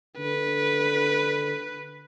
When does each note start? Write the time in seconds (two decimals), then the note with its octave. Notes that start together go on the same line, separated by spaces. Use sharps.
0.18 D3 B4